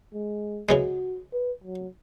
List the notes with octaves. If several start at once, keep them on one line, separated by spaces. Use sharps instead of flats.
G#3
C#3 E3 G#3 F#4
B4
F#3